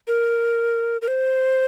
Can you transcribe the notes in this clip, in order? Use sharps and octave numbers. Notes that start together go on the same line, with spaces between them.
A#4
A#4
C5